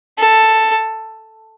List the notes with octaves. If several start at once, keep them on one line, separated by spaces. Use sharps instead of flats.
A4